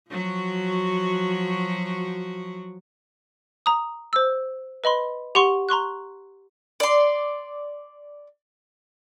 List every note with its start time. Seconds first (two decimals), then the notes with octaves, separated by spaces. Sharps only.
0.11 F3 F#3 F#4
3.66 A#5 D#6
4.13 C5 E6
4.84 B4 D#5 B5 C6
5.35 G4 F#5 C6 C#6
5.69 A#5 C6 C#6 F#6
6.80 D5 C6